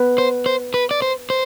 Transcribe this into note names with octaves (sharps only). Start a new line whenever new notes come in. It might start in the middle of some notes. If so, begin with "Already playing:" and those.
Already playing: B3
C5
C5
B4
D5
C5
C5